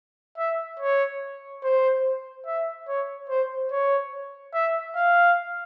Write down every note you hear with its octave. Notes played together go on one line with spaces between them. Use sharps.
E5
C#5
C5
E5
C#5
C5
C#5
E5
F5